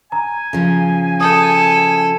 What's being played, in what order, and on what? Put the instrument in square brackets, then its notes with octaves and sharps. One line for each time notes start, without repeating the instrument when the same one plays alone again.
[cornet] G#5 [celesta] A#5
[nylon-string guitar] C#3 F3
[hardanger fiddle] A4 [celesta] D#6 G6